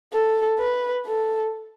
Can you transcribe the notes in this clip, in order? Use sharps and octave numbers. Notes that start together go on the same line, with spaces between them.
A4
B4
A4